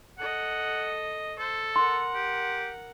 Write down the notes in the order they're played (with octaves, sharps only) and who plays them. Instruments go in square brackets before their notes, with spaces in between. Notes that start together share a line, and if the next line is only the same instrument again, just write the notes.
[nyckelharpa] A4 D#5 [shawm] F#5
[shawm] A4 [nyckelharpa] C5
[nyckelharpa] A#4 F#5 [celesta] C6
[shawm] G4